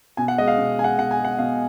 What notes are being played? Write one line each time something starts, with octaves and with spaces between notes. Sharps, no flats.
B2 G#5
F#5
G#3 D#5
F5
B2
G#3 G#5
F#5
B2 F#5
G#5
G#3
F#5
B2 F5